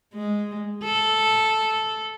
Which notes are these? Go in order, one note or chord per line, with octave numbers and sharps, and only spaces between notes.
G#3
A4